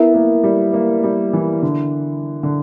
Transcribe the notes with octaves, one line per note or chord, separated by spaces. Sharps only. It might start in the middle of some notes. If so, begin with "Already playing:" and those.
Already playing: B3 E4 A#4 E5
A#3
G3
A#3
G3
E3
D3
D3